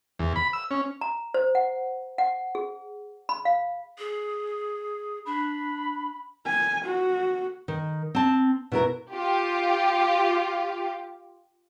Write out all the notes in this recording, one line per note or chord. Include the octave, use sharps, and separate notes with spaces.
E2
B5
E6
C#4
A#5
C5
F#5
F#5
G#4
B5
F5
G#4
D4 B5
G#5
F#4
D#3
C4 A5
B2 E4 A#4
F4 G4